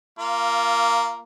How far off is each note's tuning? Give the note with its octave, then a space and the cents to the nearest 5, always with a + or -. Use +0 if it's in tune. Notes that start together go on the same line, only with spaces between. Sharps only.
A#3 +0 F4 -20